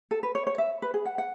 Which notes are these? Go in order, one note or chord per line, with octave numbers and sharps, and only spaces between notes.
A4
B4
C#5
C#5
E5
B4
G#4
F#5
F#5